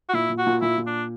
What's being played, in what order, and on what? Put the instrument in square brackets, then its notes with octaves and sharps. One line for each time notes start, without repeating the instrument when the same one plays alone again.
[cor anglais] F#4
[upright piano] A#2 [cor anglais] E4
[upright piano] A#2
[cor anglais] F#4
[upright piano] A#2
[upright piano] A#2 [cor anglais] E4
[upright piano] A#2
[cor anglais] D4